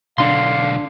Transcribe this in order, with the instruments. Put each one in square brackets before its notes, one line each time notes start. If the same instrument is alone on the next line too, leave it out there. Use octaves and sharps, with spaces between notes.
[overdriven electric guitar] B1 D3 [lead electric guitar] D4 C6 [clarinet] F5